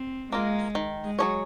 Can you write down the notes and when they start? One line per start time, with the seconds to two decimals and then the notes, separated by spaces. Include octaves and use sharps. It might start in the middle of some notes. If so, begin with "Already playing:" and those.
Already playing: C4
0.32 G#3 A#3 F4 A#4
0.75 D#3
1.04 G#3
1.19 F#3 C#4 G#4 C#5